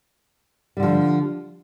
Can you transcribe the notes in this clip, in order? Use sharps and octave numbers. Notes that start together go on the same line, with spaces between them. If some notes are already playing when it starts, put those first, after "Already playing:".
D3 F3 G3